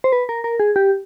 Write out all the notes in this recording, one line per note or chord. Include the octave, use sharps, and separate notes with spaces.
C5
B4
A#4
A#4
G#4
G4